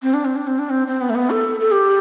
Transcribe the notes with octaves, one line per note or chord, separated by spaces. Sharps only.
C4
D4
C4
D4
C4
D4
C4
C4
B3
A3
B3
A4
A4
G4